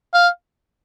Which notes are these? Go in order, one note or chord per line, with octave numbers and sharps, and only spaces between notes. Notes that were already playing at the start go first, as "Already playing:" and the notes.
F5